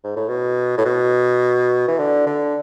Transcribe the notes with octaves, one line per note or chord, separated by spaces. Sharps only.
G#2
A2
B2
A2
B2
E3
D3
D3